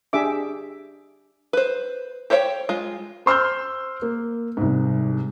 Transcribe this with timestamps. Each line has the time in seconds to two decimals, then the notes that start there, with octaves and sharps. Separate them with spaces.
0.13 D4 G4 G#4 E5 D6
1.53 B4 C5
2.30 G4 C5 C#5 F#5 G5
2.69 G#3 F4
3.26 C5 C6 E6 F6 G6
4.02 A#3
4.57 C2 G#2